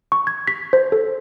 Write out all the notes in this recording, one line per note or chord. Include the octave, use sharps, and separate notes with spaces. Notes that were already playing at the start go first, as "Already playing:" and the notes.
C#6
G#6
B6
C5
A4